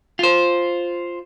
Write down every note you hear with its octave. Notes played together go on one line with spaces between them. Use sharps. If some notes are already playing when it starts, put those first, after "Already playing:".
F4 C5